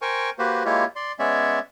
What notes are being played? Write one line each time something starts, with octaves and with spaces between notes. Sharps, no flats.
A#4 C5 G5 G#5 C#6
A#3 F#4 G4 B4 C5
G#3 A#3 E4 F4 G4 C#5
D5 C6
G#3 B3 C#4 C#5 D5 E5